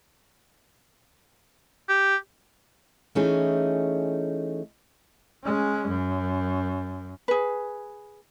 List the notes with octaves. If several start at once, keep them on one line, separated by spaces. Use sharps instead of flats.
G4
E3 A3 C#4 D#4 G#4
G#3 C#4
F#2
G#4 B4